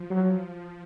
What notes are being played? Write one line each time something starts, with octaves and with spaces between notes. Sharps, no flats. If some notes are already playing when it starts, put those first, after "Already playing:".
Already playing: F3
F#3